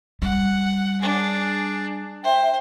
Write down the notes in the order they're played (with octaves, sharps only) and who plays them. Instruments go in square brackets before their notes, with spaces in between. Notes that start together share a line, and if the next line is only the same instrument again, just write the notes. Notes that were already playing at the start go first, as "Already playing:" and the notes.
[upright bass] G3 [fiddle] F#5
[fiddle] D4 G#4
[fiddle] C5 [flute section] E5 G5